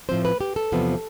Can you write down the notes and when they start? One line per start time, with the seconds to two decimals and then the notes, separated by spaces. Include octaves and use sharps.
0.09 A2 F3 C4 C5
0.25 B4
0.41 G4
0.56 A4
0.72 E2 C3 F3 B3